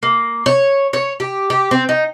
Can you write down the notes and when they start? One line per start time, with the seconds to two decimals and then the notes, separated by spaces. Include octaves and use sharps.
0.03 A#3
0.46 C#5
0.93 C#5
1.20 G4
1.50 G4
1.71 C4
1.89 D#4